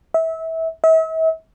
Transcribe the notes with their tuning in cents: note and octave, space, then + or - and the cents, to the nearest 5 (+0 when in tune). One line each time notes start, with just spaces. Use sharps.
E5 -25
E5 -40